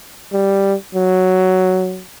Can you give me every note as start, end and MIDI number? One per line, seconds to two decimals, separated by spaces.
0.33 0.74 55
0.95 2.03 54